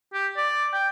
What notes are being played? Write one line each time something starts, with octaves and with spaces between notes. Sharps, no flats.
G4
D5
G5